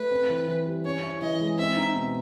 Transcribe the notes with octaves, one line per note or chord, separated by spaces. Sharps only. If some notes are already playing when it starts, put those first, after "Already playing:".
Already playing: A3 B4
C4
E3
E3
G3
C#4 C#5
E4
E3 D#5
G#3
C4 E5
D#4
B2